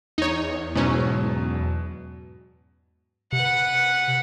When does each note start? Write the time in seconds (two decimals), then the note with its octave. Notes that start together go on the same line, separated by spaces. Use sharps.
0.18 E2 D#4 C#5
0.75 G#2 B2 F#3 C#4
3.33 C3 B4 F#5